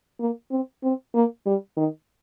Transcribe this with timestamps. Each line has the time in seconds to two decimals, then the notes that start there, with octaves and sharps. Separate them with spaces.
0.19 A#3
0.51 C4
0.83 C4
1.14 A#3
1.46 G3
1.77 D#3